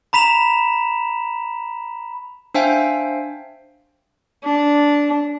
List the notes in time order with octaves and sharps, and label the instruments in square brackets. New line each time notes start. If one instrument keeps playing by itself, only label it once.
[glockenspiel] A#5 B5 B6 E7 F7
[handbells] D4 C5 E5 F5 G5 G#5
[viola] D4